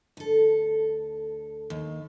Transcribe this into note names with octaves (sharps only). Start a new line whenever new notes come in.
D2 A4
D#2